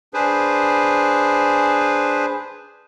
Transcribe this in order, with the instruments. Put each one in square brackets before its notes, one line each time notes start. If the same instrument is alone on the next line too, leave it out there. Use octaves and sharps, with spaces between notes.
[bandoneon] D4 G#4 B4 C5